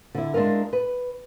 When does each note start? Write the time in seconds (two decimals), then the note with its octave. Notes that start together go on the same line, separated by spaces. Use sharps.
0.15 D3 E4
0.34 G#3 D4 E4 F4 A#4
0.73 B4